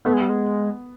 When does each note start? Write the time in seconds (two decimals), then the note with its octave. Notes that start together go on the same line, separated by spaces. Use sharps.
0.05 A3 B3
0.14 G#3
0.21 G3
0.29 G#3